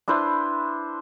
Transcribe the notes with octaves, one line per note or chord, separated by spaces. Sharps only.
D4 E4 B4 C5